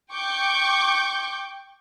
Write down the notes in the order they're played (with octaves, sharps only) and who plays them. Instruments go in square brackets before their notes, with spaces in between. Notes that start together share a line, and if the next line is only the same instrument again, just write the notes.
[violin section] G5 C#6 D6 G6